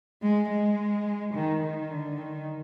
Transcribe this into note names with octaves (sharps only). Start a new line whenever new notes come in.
G#3
G#3
D#3
D#3
D3
D#3